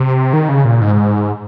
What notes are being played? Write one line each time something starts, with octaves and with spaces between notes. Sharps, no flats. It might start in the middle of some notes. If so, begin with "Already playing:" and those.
Already playing: C3
D#3
C#3
A#2
G#2